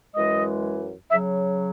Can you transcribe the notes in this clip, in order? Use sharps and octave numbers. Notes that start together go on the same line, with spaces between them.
F#2 E3 G#3 D#5
C#3 F#3 E5